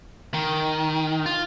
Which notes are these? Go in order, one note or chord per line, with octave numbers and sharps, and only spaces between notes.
D#3
F4